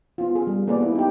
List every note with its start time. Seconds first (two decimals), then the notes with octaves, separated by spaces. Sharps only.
0.18 B3 F4
0.35 G#4
0.47 G3
0.68 A#3 B3 G#4 D5
0.81 A#3 E4
0.95 D#4 G4